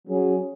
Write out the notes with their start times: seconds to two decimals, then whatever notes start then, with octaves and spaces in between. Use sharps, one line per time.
0.08 F#3 C#4 G#4